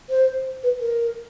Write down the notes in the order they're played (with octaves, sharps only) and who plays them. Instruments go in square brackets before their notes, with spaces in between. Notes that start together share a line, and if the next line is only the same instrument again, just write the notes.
[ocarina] C5
B4
A#4